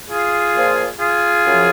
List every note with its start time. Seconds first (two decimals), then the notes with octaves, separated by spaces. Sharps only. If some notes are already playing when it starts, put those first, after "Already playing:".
0.10 F4 G#4
0.54 A#2 F3
0.99 F4 G#4
1.45 F#2 C#3 F3